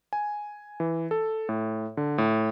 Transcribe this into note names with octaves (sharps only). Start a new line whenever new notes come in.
G#5
E3
A4
A2
D3
A2